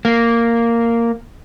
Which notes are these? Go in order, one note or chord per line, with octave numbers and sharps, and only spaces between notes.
A#3